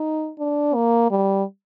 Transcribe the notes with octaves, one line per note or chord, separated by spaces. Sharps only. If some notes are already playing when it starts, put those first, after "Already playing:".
Already playing: D#4
D4
A#3
G3